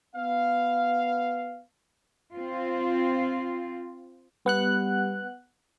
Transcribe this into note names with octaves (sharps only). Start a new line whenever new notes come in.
B3 F5
C4 F4
G3 B3 F#5 F#6